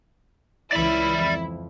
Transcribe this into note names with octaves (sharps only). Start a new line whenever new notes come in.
C#2 E3 E4 D5 B5
F2